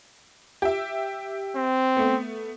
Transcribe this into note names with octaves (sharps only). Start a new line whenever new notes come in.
G4 E5
C4
A3 B3